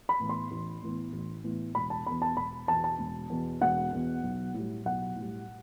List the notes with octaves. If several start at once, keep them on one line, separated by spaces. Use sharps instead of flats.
B5
A2 E3 B3
C6
A1
A2 E3 B3
A1
A2 E3 B3
E1 B5
A5
E2 B2 B5
A5
E1 B5
E2 B2 A5
A5
E1
E2 B2
E1 F#5
E2 B2
B1
A2 G3
B1 F#5
A2 G3